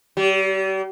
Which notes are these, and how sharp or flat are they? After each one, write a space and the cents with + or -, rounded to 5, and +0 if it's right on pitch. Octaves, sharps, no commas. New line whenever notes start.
G3 -40